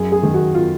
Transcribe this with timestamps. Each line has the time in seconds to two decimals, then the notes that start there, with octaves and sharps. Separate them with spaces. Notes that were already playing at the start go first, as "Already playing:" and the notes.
Already playing: F#2 G#4
0.12 G#4
0.23 D#3
0.34 F#4
0.54 F4